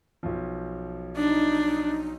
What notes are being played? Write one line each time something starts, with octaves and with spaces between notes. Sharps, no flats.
B1 F3
D4 D#4